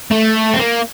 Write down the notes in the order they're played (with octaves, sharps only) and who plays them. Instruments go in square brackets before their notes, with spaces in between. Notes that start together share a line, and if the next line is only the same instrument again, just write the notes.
[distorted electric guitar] A3
C4
A#3